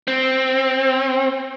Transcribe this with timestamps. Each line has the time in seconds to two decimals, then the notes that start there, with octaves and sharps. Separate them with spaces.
0.08 C4